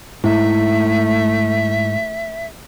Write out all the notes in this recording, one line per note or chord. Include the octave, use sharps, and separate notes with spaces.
G#2 A3 E4 E5